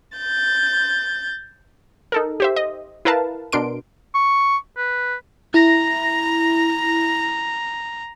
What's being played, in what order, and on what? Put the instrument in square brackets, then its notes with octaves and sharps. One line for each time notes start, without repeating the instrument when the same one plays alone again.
[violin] G6 A6
[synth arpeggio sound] D#4 A4 A#4
G4 C5 E5
D#5
E4 A#4 B4 F5 A5
B2 D4 A#4 C6 D7
[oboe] C#6
B4
[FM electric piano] E4 A#6 [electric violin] A#5